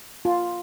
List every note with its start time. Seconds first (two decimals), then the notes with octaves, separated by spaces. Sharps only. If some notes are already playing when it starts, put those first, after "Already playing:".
0.25 F4